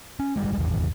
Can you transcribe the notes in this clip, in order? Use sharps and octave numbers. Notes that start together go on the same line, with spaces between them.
C#4
G1 G3 G#3
D#1 G#1 E2